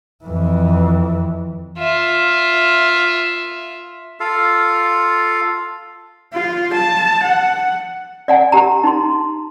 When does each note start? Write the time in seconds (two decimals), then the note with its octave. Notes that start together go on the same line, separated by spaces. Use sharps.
0.25 F2 E3
1.78 F4 E5
4.20 F4 A4 F5
6.34 F4
6.74 A5
7.23 F#5
8.28 D5 F#5 G#5
8.52 G4 A#5
8.84 D#4 C6